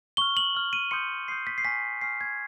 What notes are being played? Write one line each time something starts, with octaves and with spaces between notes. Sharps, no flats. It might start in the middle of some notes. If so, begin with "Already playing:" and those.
C#6 F6 G7
F#7
C#6 F6
D#7
C6 D#6 G6 C#7
C6 D#6 G6 C7
B6
C7
G#5 C#6 F6 B6
G#5 C#6 F6 C7
G#6